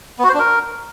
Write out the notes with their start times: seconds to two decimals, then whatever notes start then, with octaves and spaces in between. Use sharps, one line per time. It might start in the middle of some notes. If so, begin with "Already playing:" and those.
0.19 B3
0.24 F#4
0.29 C5
0.34 D4
0.39 A#4